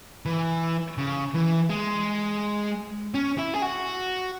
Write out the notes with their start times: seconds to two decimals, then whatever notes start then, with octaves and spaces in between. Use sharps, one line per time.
0.25 E3
0.98 C#3
1.35 E3
1.70 G#3
3.14 C#4
3.38 E4
3.54 G#4
3.62 F#4